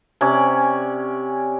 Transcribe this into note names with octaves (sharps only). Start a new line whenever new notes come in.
C3 C#4 D5 G#5